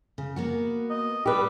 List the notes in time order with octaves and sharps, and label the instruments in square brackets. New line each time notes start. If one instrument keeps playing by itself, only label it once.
[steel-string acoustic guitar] C#3
A#3 B3 F#4
[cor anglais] D#5
[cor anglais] G3 [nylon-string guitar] G4 B4